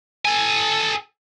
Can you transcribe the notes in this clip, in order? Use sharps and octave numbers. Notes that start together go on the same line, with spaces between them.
A4 G#5